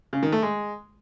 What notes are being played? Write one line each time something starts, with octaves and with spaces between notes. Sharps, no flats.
C#3
D#3
A3
G#3